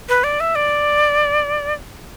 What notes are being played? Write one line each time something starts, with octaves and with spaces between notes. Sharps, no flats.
B4
D5
E5
D5